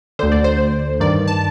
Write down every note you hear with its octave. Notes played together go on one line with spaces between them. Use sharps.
D2 D3 C5
D5
C5
G2 D#3 D5
A5